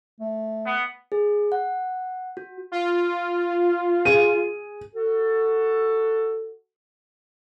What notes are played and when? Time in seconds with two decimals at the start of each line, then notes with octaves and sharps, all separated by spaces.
0.20 A3
0.66 B3
1.12 G#4
1.52 F#5
2.37 F#4
2.72 F4
4.05 G#4 D#7
4.95 F#4 A4